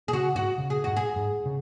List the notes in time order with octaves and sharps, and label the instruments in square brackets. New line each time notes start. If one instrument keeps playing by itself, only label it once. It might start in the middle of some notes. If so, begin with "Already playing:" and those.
[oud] G#4
[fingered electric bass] C#3 [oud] F#4
[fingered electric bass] G#2 [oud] F#4
[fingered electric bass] C#3
[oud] G#4
[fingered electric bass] G#2 [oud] F#4
[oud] G#4
[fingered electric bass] G#2
C#3